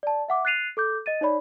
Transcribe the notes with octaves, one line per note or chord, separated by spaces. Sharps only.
D5 A5
E5 F#5 D6
F#6 A6 C7 D#7 F7
A4 D6 G6
D#5 A6 D#7
D#4 C#5 D5 B5